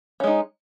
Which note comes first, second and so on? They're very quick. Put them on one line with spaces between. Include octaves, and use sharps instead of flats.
C#4 G#3 D#4